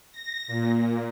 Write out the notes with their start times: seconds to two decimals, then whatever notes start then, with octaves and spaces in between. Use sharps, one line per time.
0.12 A#6
0.47 A#2